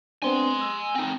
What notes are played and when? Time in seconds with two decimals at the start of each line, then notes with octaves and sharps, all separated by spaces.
0.22 B3 C4 D4 G#5 C6
0.61 E6
0.95 C4 D#4